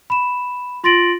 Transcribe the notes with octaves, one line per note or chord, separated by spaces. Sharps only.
B5 E7
F4 C6 A6 A#6 D7 F#7